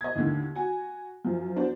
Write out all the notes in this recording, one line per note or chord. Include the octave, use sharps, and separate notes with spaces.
D#5 G#6
D#2 A2 D3 D#3
F#4 G#5
F#2 F3
B3 D4 F#4 C5